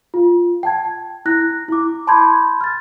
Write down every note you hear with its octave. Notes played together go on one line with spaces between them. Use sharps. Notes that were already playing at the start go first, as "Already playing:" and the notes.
F4
G5 A5 G#6
E4 F#6 A#6
E4 D6
A5 B5 C6 G6 G#6
F6 A6